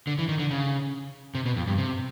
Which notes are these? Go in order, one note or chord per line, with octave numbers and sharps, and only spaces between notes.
D3
E3
D#3
D3
C#3
C3
B2
F2
G2
C3